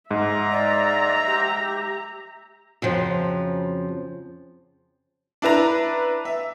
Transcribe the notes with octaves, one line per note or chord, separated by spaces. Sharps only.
G#2 E5 A#5
D5
G4
F2 C#3 F3 F#3
D4 E4 B4 A#5
E5